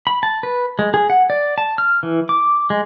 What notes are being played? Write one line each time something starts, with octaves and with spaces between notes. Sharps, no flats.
B5
A5
B4
G#3
G#4
F#5
D5
A5
F6
E3
D6
G#3